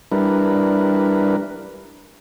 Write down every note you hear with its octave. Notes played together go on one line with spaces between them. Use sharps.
G3 D4 E4 A#4 B4